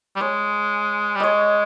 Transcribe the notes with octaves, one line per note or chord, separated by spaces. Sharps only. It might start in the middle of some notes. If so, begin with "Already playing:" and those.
G3
G#3 C#5
G3
G#3 C#5 D#5